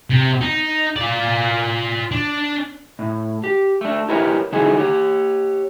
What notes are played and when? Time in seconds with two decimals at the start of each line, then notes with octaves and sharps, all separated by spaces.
0.10 C3
0.41 D#4
0.96 F4 D5
2.12 D4
2.99 A2
3.44 G4
3.81 A3 D4
4.09 E4 G4 A#4 B4 C#5
4.52 D3 D#4 E4 F#4 G#4 A4
4.77 G4 C#5